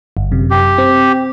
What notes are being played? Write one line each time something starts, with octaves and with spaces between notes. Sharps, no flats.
G1
F#2 C3
G4
C4